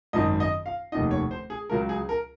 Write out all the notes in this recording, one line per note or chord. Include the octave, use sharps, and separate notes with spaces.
G#1 F#2 D#3 D#5
D#5
F5
F1 D#2 D#3 D#5
C#5
C5
G#4
C#2 C#3 F#3 A#4
G#4
A#4